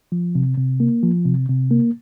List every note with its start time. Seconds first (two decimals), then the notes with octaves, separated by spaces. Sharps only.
0.12 F3
0.35 C3
0.57 C3
0.80 A#3
1.03 F3
1.25 C3
1.49 C3
1.71 A#3